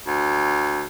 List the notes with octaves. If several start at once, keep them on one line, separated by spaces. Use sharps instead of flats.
D2